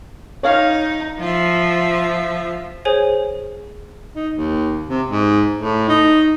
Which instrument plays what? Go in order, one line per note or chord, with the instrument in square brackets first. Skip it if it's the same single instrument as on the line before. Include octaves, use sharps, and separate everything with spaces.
[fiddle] D#4 [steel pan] C#5 F5
[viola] F3 [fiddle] F4 E5
[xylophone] G#4 C5 C#5 G#5
[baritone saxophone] D#4
D#2
C3
G#2
A2
D#4